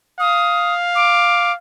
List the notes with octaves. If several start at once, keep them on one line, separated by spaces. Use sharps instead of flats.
F5 D#6
D6